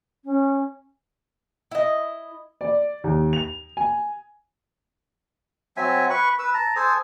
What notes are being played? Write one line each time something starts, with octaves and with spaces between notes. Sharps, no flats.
C#4
E4 D#5
D5
D#2
F7
G#5
F#3 C4 E5 G#5
B4 B5 C#6
B4 E6
A5 A#5
A4 C5 G#5 D#6